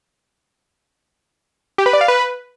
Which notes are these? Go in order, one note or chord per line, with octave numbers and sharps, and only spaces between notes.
G4
B4
D5
F5
B4